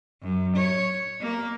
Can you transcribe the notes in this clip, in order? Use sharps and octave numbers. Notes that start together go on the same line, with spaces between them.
F#2
C#5
A#3